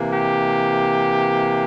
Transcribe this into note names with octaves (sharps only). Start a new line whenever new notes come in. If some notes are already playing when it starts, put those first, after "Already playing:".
Already playing: C3 E3 A#3
G4